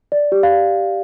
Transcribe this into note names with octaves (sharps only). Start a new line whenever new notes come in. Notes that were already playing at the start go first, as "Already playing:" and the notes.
D5
G4
F5
D5